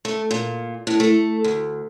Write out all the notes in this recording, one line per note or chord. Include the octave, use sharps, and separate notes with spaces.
A3
A#2
A2
A3
D2